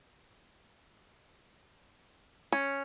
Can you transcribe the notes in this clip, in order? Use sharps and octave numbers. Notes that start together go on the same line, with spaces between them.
C#4